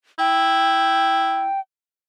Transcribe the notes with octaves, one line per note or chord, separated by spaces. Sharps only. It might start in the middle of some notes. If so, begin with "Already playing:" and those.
E4 G5